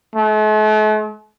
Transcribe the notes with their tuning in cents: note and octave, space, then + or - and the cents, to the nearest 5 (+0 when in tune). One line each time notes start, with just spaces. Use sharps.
A3 -45